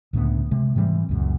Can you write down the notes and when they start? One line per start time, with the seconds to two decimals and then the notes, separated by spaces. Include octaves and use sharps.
0.13 C#2 A2 D3 B3
0.51 C3 G#3
0.76 G#2 E3 G3 C4
1.09 C#2 F#2 A#2